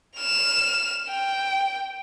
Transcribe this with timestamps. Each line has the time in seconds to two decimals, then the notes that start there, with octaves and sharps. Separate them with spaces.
0.18 F6 E7
1.11 G5